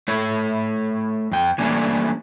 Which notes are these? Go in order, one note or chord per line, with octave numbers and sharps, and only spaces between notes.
A3 E4 A4 C#5
F2 G5
E3 G3 A3 A#3 C#4 D4